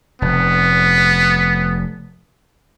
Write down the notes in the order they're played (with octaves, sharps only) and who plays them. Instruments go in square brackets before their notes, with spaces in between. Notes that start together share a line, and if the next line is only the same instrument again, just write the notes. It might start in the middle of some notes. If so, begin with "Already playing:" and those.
[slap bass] F1 [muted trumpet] B3